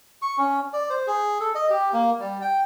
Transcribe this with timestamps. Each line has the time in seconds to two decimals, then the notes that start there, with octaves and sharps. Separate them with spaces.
0.22 C#6
0.38 C#4
0.73 D5
0.90 C5
1.07 G#4
1.40 A4
1.55 D#5
1.70 G4
1.93 A#3
2.19 G3
2.41 G5